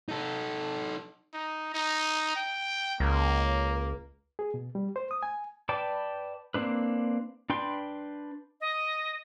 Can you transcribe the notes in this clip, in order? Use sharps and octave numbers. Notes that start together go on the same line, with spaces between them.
D#4 A4
D#4
D#4
G5
C#2 A#3
G#4
B2
G3
C5
D#6
G#5
B4 D5 G5 A5
A#3 C4 D4 B4
D4 B4 G5 C6
D#5